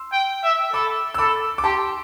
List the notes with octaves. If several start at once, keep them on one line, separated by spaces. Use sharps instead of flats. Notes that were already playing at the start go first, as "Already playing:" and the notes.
Already playing: C6 E6
G5
E5
A4 B5 D6
E6
A4 B5 D6
D6
G4 A5 C6